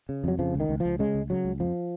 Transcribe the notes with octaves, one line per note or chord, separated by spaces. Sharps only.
C#3
F2 F#3
C#3 F3
C#2
D#3
C#2
F3
C#2
C#3 G#3
C#2
C#3 F#3
C#2
F2 F3